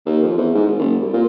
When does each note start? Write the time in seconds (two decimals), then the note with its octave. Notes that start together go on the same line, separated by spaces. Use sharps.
0.06 D#2
0.23 F2
0.37 E2
0.54 G#2
0.67 G#1
0.79 F#1
1.00 C2
1.13 A#2